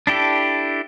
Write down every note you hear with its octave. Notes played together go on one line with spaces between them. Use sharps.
D4 E4 G4 A4